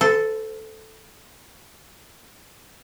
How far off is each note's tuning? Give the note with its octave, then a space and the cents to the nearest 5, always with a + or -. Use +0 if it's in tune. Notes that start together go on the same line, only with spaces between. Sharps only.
A4 +0 C5 -40